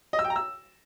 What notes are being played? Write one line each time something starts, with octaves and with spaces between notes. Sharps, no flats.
D#5
E6
G5
A#5
E6